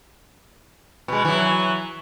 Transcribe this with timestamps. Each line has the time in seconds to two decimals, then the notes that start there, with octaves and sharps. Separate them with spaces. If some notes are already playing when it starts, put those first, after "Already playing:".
1.08 B2 G#3
1.25 E3 F#3